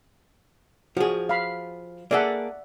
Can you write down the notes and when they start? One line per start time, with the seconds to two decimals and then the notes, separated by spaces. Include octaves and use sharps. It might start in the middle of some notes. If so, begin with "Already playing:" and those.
0.97 F3 F#4 G#4
1.29 F5 B5
2.11 A#3 G#4 A4 D5 E5 F#5